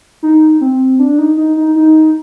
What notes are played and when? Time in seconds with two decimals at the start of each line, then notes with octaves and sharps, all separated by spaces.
0.23 D#4
0.61 C4
0.99 D4
1.18 D#4
1.37 D#4
1.57 D#4
1.76 D#4